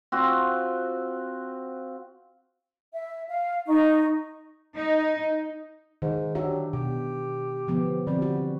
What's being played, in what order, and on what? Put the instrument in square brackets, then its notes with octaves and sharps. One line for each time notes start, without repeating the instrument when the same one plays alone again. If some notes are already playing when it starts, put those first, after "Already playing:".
[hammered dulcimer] C4 F4 F#4
[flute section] E5
F5
D#4 D#5 C#6
[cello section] D#4
[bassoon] G#2 [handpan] D#3
[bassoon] F#3 [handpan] D4 G4 E5
[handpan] B2 [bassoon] G4
[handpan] D3 F3 B3
[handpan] D3 F3 C4 [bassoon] G3
[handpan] F#4